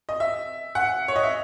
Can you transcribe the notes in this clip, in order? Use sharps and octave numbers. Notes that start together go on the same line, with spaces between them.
D#5
E5
F#5
C#5
D#5
E5